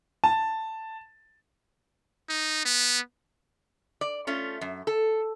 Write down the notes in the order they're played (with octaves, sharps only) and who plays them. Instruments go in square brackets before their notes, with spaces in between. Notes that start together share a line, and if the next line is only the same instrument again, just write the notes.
[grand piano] A5
[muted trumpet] D#4
B3
[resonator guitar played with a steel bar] D5
A3 C#4 F4
F#2
A4